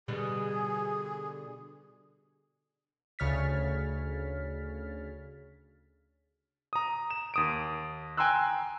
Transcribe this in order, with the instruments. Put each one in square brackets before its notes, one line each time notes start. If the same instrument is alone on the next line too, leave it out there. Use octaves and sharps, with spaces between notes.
[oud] B2 D3 G3 [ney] G#4
[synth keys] D2 C#3 C#5 F6 A6 B6
[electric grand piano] A#5 D#6
E7
D#2 D#6 D7
G5 G#5 A#5 C6 E6 F#6